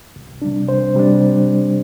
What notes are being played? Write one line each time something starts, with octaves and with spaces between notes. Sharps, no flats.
C2
C3 G3 D4
C2 C5
C3 G3 D4